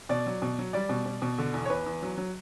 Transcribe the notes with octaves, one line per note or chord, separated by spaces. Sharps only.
B2 D5
F#3
B2
F#3
G3 D5
B2
B2
B2
D3
E2
C#5
E2 B4
E2
F#3
F#3